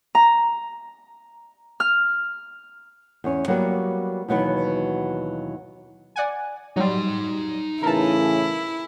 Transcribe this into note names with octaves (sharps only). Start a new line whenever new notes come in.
A#5
F6
E2 C#4
F#3 G3 A#3 B3 F#4
D#2 B2 E3 F#3 B3 B4
D5 F#5 G#5
F#3 G3 D#4 C6
A2 C#3 E3 E4 A#4 A5